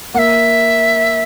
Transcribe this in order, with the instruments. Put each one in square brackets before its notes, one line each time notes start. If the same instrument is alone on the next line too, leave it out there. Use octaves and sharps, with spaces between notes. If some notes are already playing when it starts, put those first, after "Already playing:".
[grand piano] A#3 [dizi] E5 F#5